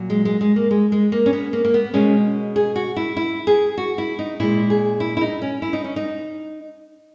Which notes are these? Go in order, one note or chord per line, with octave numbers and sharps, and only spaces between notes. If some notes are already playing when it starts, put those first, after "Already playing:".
Already playing: A#2 F#3
G#3
G#3
G#3
A#3
G#3
G#3
A#3
C#4
B3
A#3
A#3
B3
B2 G#3 C#4
G#4
F#4
E4
E4
G#4
F#4
E4
D#4
A#2 G#3 E4
G#4
E4
E4
D#4
C#4
E4
D#4
C#4
D#4